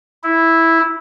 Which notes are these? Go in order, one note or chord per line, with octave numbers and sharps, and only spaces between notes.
E4